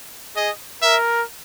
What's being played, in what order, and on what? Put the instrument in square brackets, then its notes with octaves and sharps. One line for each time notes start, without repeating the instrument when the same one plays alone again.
[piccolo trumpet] G#4 [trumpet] D#5
[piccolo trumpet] A#4 [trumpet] E5